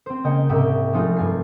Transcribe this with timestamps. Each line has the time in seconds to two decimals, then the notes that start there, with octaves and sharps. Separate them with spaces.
0.06 C4 C5
0.24 C#3 A#3 D#5 G5 G#6 C#7
0.49 C2 G#2 E5 G5 D#6 E7
0.93 F3 G#3 A3 C4 D#4 F4
1.17 G2 F4 A4 G#5 C7